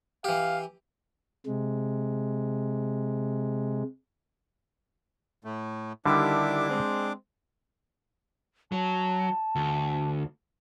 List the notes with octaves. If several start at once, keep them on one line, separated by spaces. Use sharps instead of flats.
E3 G4 F5
C3 G#3
A2 A3
D3 D#3 G3 D4 E4 G4 D6
G#3 C4 C5
F#3 A5
D2